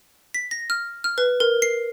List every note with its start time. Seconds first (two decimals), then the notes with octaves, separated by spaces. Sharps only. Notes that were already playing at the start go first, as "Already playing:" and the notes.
0.34 B6
0.51 A#6
0.70 F6
1.04 F6
1.18 B4
1.40 A#4
1.62 C7